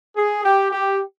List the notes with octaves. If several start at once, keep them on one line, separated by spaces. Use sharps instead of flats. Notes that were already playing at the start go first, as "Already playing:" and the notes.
G#4
G4
G4